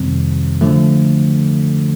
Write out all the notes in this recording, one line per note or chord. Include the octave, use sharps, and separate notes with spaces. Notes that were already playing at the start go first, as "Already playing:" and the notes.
Already playing: F2 C3 D#3 G3 C4
D3 F3 A3